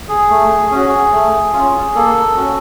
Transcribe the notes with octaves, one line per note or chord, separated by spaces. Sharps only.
G#4
A3
C#4 F#4
A3
C#4 F4
A#3 A4
C#4 F#4